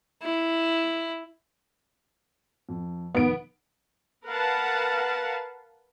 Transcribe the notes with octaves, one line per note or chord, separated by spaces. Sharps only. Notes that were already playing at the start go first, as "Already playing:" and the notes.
E4
F2
F1 D#3 B3 F#5 D7
A#4 B4 F5 F#5 A5